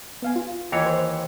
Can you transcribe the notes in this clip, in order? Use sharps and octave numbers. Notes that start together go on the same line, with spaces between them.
B3 F5 G#5
F4
D#2 E3 C#5
C5